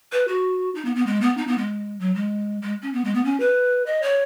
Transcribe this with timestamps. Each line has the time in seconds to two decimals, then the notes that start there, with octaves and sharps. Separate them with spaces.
0.12 B4
0.28 F#4
0.75 D#4
0.85 B3
0.96 B3
1.06 G#3
1.21 B3
1.37 D#4
1.47 B3
1.58 G#3
1.99 F#3
2.15 G#3
2.62 G#3
2.82 C#4
2.93 B3
3.05 G#3
3.14 B3
3.24 C#4
3.40 B4
3.86 D#5
4.02 C#5